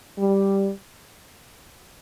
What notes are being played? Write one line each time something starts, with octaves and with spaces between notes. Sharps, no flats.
G3